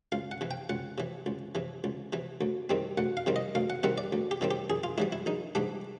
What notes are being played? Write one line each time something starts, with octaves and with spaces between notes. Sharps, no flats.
C#2 F5
F#5
C3 E3
G5
C#2 F#5
C3 E3
C#2
C3 E3
C#2
C3 E3
D2
C3 D#3 G3 C4
D2 F#5
F5
C3 D#3 G3 C4
D#5
D2 F5
F#5
C3 D#3 G3 C4 F#5
D5
D2
G4
C3 D#3 G3 C4
G4
A#1 G#4
F4
G#2 E3 G3 E4
E4
A#1 D#4
G#2 E3 G3 D4